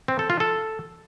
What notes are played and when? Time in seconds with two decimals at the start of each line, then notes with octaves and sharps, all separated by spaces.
0.08 C4
0.19 A4
0.30 F4
0.40 A4